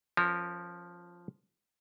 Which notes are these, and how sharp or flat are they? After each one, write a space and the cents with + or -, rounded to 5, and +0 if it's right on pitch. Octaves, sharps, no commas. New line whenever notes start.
F3 +0 C#4 -20 A#4 -20